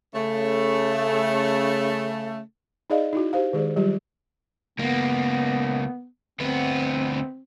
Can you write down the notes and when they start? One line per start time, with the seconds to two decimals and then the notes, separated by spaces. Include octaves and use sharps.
0.14 C#3 A3
2.90 D#4 G#4 D5 D#5 F5
3.13 D#4 E4 F#4
3.33 G4 C5 F5
3.53 D#3 G#3 G#4 D5
3.76 F#3 G3 F4 G4
4.79 C#2 A#3 B3
6.40 D2 B3 C4